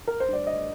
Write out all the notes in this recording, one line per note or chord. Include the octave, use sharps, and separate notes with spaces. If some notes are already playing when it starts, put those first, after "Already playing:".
A#4
C5
G2 D5
D#5